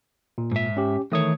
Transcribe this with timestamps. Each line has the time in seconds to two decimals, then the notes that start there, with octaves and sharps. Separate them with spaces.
0.38 A#2
0.52 G#2 E5
0.77 C#4 G4
1.12 D#3 E3 A3 C#5 D#6